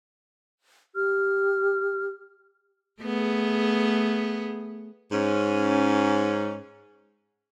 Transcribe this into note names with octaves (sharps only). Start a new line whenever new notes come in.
G4 F6
A3 B3 G#4
G#2 C#4